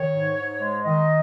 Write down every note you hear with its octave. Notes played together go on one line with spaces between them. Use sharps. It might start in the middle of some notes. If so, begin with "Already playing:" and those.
Already playing: D#3 C#5
G#2
G#2
G#3
D#3 D#5